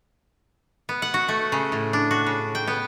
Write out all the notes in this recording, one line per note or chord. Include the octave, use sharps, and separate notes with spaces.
B3
F#5
F#4
A3
C#3
A2
D4
F#4
C#3
G5
B3